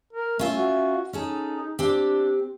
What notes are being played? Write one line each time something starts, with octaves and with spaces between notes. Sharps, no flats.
A#4
A3 C#4 F4 E5
F#4
C#4 D#4 G#4 A4
C4 D4 G4